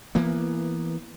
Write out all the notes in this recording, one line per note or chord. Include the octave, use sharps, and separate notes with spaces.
E3 A#3 B3